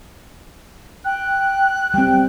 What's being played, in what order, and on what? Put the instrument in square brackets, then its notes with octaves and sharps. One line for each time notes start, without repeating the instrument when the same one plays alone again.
[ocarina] G5 [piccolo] F#6
[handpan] G3 C4 [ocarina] G5